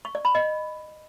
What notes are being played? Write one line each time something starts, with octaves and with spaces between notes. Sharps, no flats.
C#6
D5
B5
D#5